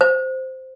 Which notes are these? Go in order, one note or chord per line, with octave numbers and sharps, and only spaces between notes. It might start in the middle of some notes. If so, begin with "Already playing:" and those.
C5